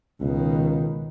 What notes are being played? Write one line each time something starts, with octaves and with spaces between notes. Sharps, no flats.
C#2 B2 D#3